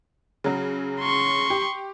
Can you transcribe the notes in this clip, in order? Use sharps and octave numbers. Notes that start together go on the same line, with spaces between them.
C#3 F#3
C6 C#6
G4